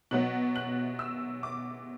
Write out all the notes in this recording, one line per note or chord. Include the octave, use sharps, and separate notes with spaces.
B2 F#3 B3 F#6
F#6
E6
D6